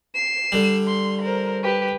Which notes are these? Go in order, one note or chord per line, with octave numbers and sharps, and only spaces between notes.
C7 E7
D3 G3
C6
A#4 C5
G4 B4